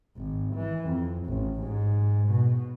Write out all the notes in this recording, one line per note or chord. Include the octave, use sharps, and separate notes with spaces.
G#1
E3
F2
A1
G#2
B2